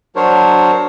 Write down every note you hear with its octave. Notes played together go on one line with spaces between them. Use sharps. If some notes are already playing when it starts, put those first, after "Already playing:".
F#3 D4 A#4 C5 C#5